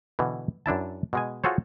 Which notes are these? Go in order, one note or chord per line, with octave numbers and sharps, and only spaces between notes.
B2 D3 E3
F#2 D4 E4 A5
B2 G#3 G#5
F4 F#4 G#4 A4 C5 C#5